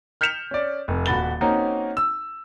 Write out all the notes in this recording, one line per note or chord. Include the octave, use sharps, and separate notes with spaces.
F6 G6 B6 C#7 E7 F7
C#4 D5
F1
D#1 F#4 B5 A6 G7
A#3 C4 C#4 D#4 F#4
E6